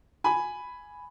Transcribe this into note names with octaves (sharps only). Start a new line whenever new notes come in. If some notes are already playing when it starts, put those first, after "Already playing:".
G#5 B5